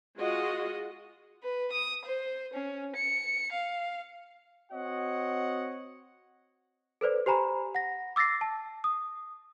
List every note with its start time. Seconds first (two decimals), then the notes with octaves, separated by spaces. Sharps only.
0.19 G#3 F4 F#4 D#5
1.43 B4
1.72 D#6
2.05 C5
2.53 C#4
2.95 C#7
3.53 F5
4.72 C4 F#4 C#5 D#5 F#5
7.01 A4 B4 C5 D5
7.26 G4 C5 G#5 A#5 B5
7.75 F#5 A#6
8.16 D6 E6 A6 A#6 C7
8.41 A5
8.84 D#6